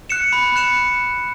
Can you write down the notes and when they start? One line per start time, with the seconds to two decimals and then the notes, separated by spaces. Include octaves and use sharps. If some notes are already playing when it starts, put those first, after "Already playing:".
0.10 F#6 C#7 E7
0.33 B5
0.56 F#6 C#7 E7